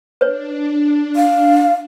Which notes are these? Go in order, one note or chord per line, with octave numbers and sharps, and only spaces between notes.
D4 B4 C#5
F5